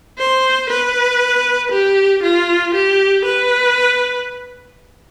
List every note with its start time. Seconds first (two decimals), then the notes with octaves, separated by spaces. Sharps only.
0.18 C5
0.70 B4
1.72 G4
2.23 F4
2.74 G4
3.25 B4